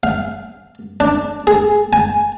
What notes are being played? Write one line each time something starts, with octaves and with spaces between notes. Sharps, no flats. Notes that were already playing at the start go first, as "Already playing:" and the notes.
F5
D4
G#4
G#5